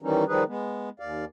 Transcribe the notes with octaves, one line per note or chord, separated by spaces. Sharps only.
D#3 E3 G3 C#4 D#4
D#3 F3 G3 D#4 G#4 B4
G#3 B3
D#2 D5 F5